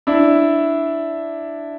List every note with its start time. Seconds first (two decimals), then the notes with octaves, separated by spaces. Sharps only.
0.07 D4 E4